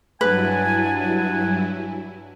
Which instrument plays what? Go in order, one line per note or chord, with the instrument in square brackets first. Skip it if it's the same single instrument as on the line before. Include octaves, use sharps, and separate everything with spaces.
[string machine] G2 F#3 E4 [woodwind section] B3 D4 G#5 [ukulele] B4